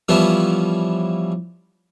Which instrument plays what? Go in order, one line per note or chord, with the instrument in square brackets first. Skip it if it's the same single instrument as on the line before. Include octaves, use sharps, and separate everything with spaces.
[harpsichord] E3 F3 G3 B3 C#4 E4